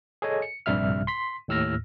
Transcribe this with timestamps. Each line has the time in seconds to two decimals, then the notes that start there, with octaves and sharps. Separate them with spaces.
0.22 G#4 A4 C#5 D#5 G#5
0.42 C#7
0.66 A#1 G2 C3 G3 E5 F6
1.07 C6 B6
1.48 D#2 A2 E6 F6 A#6